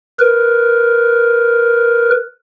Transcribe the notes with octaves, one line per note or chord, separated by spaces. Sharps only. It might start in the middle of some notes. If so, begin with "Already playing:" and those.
A#4 B4